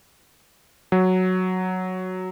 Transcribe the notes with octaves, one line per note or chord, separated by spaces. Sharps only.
F#3